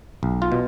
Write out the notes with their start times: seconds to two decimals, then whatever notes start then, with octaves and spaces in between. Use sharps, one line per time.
0.23 B1
0.42 F4
0.52 B2